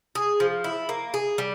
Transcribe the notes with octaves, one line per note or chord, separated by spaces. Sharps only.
G#4
F3
E4
A#3
G#4
G3